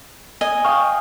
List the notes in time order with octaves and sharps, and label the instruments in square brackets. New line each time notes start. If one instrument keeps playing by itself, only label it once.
[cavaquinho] D#5 G#5
[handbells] F5 G5 F6 [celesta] C#6 D#6